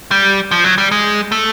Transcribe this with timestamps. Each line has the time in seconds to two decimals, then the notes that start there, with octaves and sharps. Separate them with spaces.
0.11 G3
0.51 F3
0.64 F#3
0.78 G3
0.91 G#3
1.32 A3